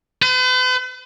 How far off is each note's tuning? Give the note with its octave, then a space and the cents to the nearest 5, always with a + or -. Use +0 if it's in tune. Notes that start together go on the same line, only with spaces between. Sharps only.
B4 +45